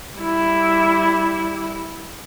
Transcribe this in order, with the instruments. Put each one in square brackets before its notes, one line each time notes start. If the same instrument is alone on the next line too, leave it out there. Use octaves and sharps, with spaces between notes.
[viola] G3 E4